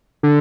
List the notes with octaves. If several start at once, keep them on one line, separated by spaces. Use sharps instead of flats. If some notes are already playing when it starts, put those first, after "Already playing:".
D3